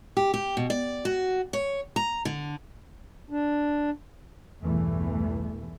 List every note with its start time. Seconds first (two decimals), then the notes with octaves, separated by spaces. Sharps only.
0.17 G4
0.34 G4
0.57 B2
0.70 D5
1.05 F#4
1.53 C#5
1.96 A#5
2.25 D3
3.30 D4
4.62 B1 E2 G2 E3 A3